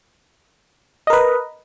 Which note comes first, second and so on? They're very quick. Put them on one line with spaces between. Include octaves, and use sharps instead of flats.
D#5 A#4 B4